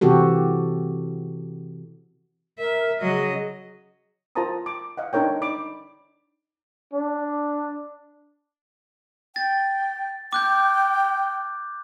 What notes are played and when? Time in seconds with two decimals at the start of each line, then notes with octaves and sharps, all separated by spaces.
0.01 C3 E3 C4 F#4 G4 A4
2.59 A#4 E5
3.01 C#3 F#3 D#5
4.35 F4 A#4 C5 A5 A#5 D#6
4.66 D6
4.97 D#5 F5 F#5
5.13 D4 D#4 A#4 C#5 G5
5.41 D#4 D5 B5 D6
6.93 D4
9.36 G5 A6
10.33 G5 D6 F#6 G6